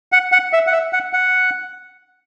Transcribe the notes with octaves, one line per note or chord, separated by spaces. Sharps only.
F#5
F#5
E5
F#5
E5
F#5
F#5